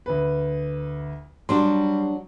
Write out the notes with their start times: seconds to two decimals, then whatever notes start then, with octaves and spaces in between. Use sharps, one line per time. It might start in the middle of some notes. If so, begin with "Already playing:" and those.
0.06 D2 B4
1.49 F#3 G3 D4 F#4 C6